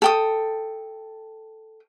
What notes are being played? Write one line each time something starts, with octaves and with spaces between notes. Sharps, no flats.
A4 G5 D#6